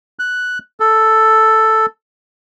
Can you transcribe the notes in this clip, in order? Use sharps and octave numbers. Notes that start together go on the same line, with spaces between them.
F#6
A4